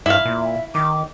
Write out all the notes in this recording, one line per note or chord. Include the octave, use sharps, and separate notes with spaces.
G2 E4 F5
A#2
E5
D#3 D6